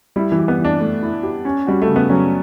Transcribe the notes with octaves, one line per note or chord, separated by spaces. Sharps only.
G3 E4
E3
G4
B3
E3
D4
A3
E4
G4
C#4
G3 F#4
A3
C#3
B3
F#3 C#4